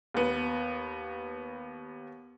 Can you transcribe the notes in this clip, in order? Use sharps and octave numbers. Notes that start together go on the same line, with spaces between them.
D#2 B3